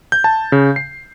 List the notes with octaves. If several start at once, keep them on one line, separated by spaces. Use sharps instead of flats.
G6
A5
C#3
C7